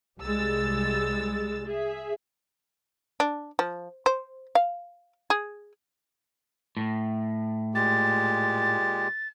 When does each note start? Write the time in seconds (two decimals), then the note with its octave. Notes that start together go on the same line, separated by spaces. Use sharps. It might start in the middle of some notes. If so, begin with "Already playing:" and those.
0.20 C2 G3 G#3 E6 A6
1.65 G#4 E5
3.20 D4
3.59 F3
4.06 C5
4.55 F5
5.30 G#4
6.77 A2
7.75 A#2 G#3 G4 A6